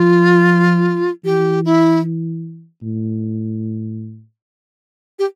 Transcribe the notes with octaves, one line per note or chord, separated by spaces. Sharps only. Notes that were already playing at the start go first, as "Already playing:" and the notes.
Already playing: F3 F4
E3 G4
E4
A2
G4